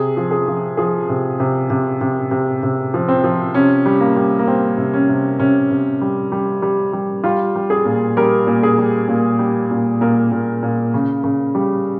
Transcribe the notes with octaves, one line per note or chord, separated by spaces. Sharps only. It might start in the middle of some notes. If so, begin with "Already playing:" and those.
Already playing: C3 G#4
F3
G#4
F3
F3 G#4
C3
C3
C3
C3
C3
C3
F3
C4
F3
C3 C#4
G3
A#3
G3
A#3
G3 C4
C3
C#4
C3
C3 C#4
C3
G3
G3
G3
G3
G3 F4
G3
G#4
A#2
G3 A#4
A#2
G#4
G3
A#2
G3
A#2
A#2 A#4
A#2
A#2
C#3
C#3
G3